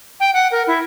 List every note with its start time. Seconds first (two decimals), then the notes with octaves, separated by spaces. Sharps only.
0.20 G5
0.34 F#5
0.52 A#4
0.67 E4